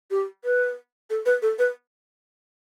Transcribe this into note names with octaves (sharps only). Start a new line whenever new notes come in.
G4
B4
A4
B4
A4
B4